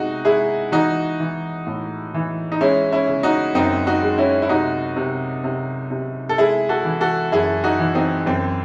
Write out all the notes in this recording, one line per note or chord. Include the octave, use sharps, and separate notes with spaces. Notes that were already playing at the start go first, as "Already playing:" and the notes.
Already playing: C3 G#3 D#4 F#4
G#3 E4 G#4
E3 D#4 F#4
E3
A2
E3
D#4
G#3 C#4 E4
C#4 E4
C#3
D#4 F#4
F#2 C4 D#4
D#4 F#4
G#3
C#4 E4
E4
C3 D#4 F#4
C3
C3
C3
A4
G#3 E4 G#4
F#4 A4
E3
F#4 A4
F#2 E4 G#4
D#4 F#4
E3
C4 D#4
F#2 C4